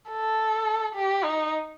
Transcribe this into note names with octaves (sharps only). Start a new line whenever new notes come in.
A4
G4
D#4